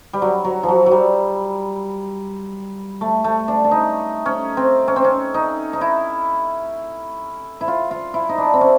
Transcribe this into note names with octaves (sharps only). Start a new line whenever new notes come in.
G3
F#3
F#3
F3
F#3
F#3
G3
A3
A3
D4
D4
D#4
C#4
C4
C#4
C4
C#4
D#4
D#4
E4
E4
F4
F4
E4
D#4
D4
C4
C#4